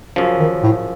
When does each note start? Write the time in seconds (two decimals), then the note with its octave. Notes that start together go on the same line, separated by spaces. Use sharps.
0.16 F#2 C#3 F3
0.39 D#3
0.63 A2